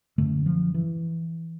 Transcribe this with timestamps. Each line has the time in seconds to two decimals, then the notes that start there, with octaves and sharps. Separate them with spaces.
0.18 F#2 D3 A3
0.46 F3
0.74 E3